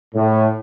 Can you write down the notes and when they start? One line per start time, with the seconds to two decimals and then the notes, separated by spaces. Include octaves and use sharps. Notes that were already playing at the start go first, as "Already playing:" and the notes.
0.15 A2